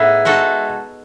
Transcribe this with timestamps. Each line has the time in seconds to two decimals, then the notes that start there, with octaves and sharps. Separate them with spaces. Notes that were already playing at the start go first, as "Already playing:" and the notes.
Already playing: A2 B3 D#4 G#4 E5
0.25 G#3 D#4 F#4 A4